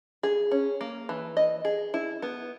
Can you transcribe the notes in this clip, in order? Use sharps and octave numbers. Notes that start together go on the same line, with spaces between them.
G#4
C#4
A#3
E3
D#5
G#4
E4
B3